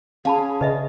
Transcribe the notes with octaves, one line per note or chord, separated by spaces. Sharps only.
C#4 G#4 F5 A5 B5
C#3 B4 D#5 E5